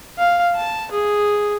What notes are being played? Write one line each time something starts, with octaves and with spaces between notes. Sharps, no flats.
F5
A5
G#4